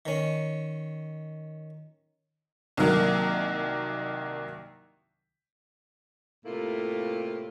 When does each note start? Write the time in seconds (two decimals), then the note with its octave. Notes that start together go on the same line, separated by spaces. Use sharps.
0.06 D#3 C#4
2.77 C2 D#3 F#3 A#3
6.45 A2 C3 A3 A#3 E4 F4